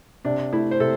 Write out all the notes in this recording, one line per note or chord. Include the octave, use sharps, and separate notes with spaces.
C3 D4
A3 E4
C5
C3 A4